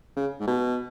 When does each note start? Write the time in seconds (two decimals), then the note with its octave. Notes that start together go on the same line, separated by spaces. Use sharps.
0.16 C#3
0.40 G#2
0.48 B2